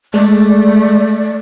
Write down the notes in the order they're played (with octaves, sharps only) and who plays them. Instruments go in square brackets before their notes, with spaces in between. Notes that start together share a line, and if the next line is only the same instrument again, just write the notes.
[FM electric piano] G#3 [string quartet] A3 [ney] D5